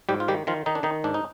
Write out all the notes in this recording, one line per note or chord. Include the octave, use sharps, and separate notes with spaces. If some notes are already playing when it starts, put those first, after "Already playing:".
G#2 G3 G4
F4
D#3 G3 G4
D#3 F3 F4
D#3 D#4
D4
D#3 D#4
G#2 D4
D#4